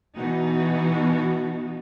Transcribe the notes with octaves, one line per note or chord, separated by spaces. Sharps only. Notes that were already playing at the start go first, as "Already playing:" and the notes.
B2 E3 D#4 F#4